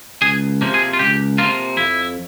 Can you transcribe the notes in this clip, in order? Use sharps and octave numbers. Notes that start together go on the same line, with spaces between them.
C#2 G#4
C3 F3 A#3
G#4
F4
C#2 G4
C3 F3 A#3 F4
F2 E4